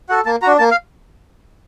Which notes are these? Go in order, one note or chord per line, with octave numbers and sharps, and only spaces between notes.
F#4 A4 F#5
A#3 A5
D4 F#4 A#5
A#3 A5
F5